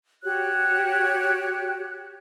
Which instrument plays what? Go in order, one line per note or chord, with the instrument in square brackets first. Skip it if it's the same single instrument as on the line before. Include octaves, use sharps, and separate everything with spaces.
[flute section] F#4 G4 C#5 F#6